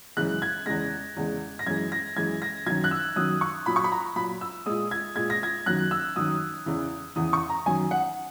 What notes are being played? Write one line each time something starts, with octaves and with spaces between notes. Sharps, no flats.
F#2 C#3 E3 G#3 F#6
G#6
E2 C#3 G#3 A#6
E2 C#3 G#3
A#6
F#2 E3 G#3 G#6
A#6
F#2 E3 G#3 G#6
A#6
F#2 D#3 F#3 G#6
F#6
E6
F#2 D#3 F#3 D#6
C#6
A#2 F#3 B5
C#6
B5
A#5
A#2 F#3 B5
E6
A#2 G#3 D#6
G#6
A#2 G#3 G#6
A#6
G#6
F#2 D#3 F#3 F#6
E6
F#2 D#3 F#3 D#6
E2 C#3 E3
E2 C#3 E3 D#6
C#6
A#5
F#2 D#3 F#3 G#5
F#5